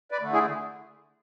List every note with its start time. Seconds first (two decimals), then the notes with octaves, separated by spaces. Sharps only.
0.11 B4 D5
0.21 D3 A3
0.33 E4 G#4